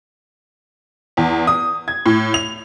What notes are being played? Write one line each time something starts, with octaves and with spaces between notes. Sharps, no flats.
E2
D#6
G#6
A2
F7